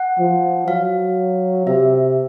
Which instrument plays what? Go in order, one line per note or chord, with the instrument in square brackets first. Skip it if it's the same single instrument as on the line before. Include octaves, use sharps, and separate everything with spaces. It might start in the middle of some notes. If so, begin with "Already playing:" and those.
Already playing: [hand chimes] F#5
[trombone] F3
[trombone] F#3 [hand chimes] F5
[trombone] C3 [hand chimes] E5